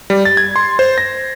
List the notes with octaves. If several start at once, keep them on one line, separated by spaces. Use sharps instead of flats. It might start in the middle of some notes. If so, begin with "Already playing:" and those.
G3
A6
G#6
C6
C5
A#6